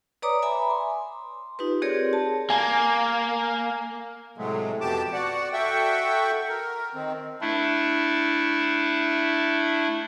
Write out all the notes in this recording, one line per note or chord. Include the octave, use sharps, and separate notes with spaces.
B4 C#5 D5 A#5 D6 D#6
E5 G#5 A#5 B5 D6
C6
D#4 F4 G4 B4
C4 G4 G#4 A#4 C#5 D5
A5
A#3 G#5
A2 C3 F#3 G#3 A3
F2 B2 G4 A5 D6
F#4 D5 F#5
F#4 A4 E5 F#5 G5 C#6
A#4
D#3 C4
A3 D4 E4